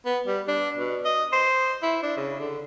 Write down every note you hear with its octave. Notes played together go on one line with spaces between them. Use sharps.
B3
G3
D4
B2
D#5
C5
E4
D4
C#3
D3